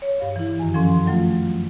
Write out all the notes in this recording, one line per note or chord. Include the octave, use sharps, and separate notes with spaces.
C#5
G2 F5
E3 E4
F#2 D#3 G#5
F3 C#4 A4 C6
F3 F#3 A3 F4